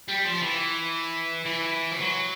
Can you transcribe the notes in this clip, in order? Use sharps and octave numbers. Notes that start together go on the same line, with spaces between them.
G3
F3
E3
E3
F3
F#3